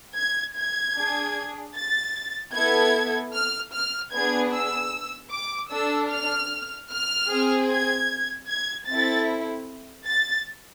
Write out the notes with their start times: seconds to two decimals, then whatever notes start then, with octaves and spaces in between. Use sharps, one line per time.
0.17 G#6
0.56 G#6
0.96 D4 G#4
1.75 A6
2.54 B3 E4 A4 G#6
3.33 F6
3.72 F6
4.12 B3 D4 G#4 G#6
4.51 E6
5.32 D6
5.70 D4 A4 E6
6.10 F6
6.90 F6
7.28 C4 G#4
7.68 G#6
8.48 G#6
8.87 C4 E4 A4 A6
10.06 A6